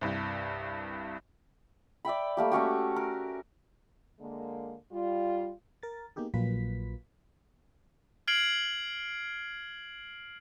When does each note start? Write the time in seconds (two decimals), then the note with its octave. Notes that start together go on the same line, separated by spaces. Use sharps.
0.01 C2 G2
2.05 D5 E5 G5 B5
2.37 G3 A3 A#3 G4
2.52 A3 C#4 F#4 G4
2.96 A#4
4.20 D3 G#3 A#3
4.92 G3 F4
5.83 A#4 A6
6.16 A#3 B3 D#4 G4 G#4
6.34 A#1 F#3 A#3 F4 B4 B6
8.28 F6 G#6 C7 D7 F#7